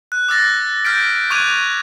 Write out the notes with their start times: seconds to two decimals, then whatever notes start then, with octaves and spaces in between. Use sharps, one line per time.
0.12 F#6
0.29 D6 E6 A6 A#6
0.85 F6 G6 A6 B6 D7
1.30 C#6 D6 F#6 G#6 D#7 F7